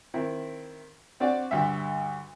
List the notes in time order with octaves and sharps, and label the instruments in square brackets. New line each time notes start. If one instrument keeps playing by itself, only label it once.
[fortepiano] D#3 C4 E4
C4 D4 F#4 D5
D2 G2 E5